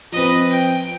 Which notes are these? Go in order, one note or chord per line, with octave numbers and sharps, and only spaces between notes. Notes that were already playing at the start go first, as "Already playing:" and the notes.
F3 C4 B4 D#5
G5